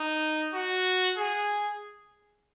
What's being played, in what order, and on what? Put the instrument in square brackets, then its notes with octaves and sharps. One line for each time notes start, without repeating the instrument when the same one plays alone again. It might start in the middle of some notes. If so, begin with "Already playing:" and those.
Already playing: [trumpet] D#4
F#4
G#4